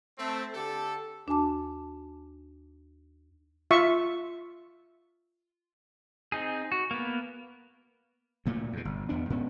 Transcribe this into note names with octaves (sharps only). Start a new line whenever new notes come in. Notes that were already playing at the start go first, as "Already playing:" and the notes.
A3 C4
D3 G4 A4
D#2 D4 F#4 G#5 A5 D6
F4 E5 C#6
C4 D#4 G#4
F#4
A#3 B3
D2 A#2 A3
E2 B2
G1
E2 B3 D4
G#2 B3 C#4